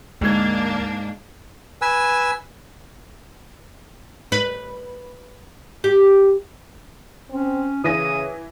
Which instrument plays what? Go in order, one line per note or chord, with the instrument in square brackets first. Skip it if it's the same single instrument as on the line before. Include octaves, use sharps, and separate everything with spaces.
[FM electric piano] D2 G#6 [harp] G#2 [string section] A#3 D4
[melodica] B4 G#5 E6
[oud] B4
G4
[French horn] C4 [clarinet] C#4
[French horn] C#3 [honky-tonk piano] E3 A#6 D#7 [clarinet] D#6